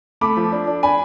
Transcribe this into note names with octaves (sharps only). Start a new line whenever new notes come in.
A3 B5 D6
F3
D4
D4
D4 G#5 B5